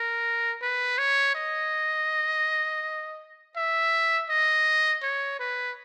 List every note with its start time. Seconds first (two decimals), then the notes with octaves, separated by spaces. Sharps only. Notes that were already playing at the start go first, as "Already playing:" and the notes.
Already playing: A#4
0.62 B4
0.98 C#5
1.35 D#5
3.56 E5
4.30 D#5
5.03 C#5
5.40 B4